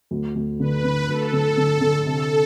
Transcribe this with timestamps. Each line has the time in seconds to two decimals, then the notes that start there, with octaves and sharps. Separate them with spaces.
0.11 D2
0.36 D2
0.60 D3 B4
0.84 D3
1.08 D2 A4
1.33 D3
1.57 D3
1.81 D3
2.06 C3 A4